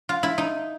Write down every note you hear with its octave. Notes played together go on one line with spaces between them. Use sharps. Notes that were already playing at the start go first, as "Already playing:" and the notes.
F4
E4
D#4